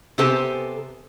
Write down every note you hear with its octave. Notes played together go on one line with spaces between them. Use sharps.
C3 B3 G4 A4 C5 G#5